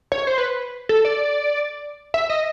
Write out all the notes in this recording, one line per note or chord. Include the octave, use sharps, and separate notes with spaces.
C#5
C5
B4
A4
D5
E5
D#5